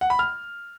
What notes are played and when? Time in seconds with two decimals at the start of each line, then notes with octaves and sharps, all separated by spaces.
0.01 F#5
0.10 B5
0.19 F6